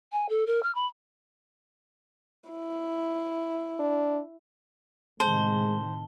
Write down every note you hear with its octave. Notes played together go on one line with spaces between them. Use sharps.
G#5
A4
A#4
F6
B5
E4
D4
A2 C3 D#3 G#3 C5 A5 G7